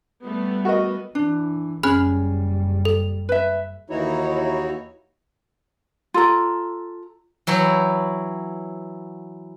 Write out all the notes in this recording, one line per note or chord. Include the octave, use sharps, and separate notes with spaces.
G3 A3 B3
F#4 A#4 D#5
E3 D4
F#1 G3 C#4 G#4 B5 F6 F#6
A4
B4 E5
D#2 E3 D#4 E4 F#4 C#5
F4 A4 A#5
E3 F#3 E4 G5